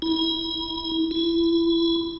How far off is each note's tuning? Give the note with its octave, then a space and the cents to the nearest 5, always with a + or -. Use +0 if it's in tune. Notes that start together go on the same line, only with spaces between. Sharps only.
E4 -30
E4 +25